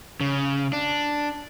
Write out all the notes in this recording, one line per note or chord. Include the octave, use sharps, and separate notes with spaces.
C#3
D4